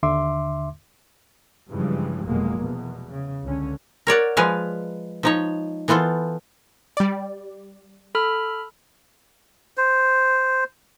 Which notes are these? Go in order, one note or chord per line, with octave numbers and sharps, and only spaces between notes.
D#2 D3 E5 C6 D6
G2 C#3 E3 F3 G3 G#3
F1 F2 B2 F#3 G#3 A#3
E2 B2
C#3
C#2 D3 C#4
A#4 C#5 D5 F#5
F3 G#3 B4 F5 G#5
F3 D#4 C#5
E3 B3 F4 A4 C5
G3 D5
A4 B5 F6
C5